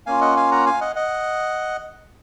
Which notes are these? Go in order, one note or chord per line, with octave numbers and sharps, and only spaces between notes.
A#3 C#4 F4 F5 G#5
D#5 F#5
F5 G#5
F#5 A#5
F5 G#5
D#5 F#5
D#5 F#5